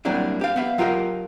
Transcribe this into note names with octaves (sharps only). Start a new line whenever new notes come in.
F#3 G3 A#3 C4 D4 E4
G4 F5
B3 E5 F5
F#3 F4 G4 A#4 D#5